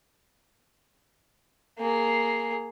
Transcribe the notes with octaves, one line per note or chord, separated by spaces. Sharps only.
A#3 G#4